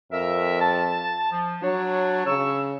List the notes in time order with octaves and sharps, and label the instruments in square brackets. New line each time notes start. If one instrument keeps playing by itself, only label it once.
[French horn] F2 [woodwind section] A#4 E5
[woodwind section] A5
F3
[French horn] F#3 [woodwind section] D4 C#5
[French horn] C#3 [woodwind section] C#6 E6